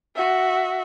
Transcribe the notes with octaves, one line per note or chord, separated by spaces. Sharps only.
F#4 E5